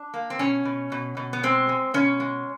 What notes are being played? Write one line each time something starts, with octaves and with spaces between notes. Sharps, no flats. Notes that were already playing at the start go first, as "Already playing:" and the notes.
Already playing: D4
A#3
C4
B2 C#4
B2
B2
B2
B3
G#3 C4
G#3
B2 C#4
G#3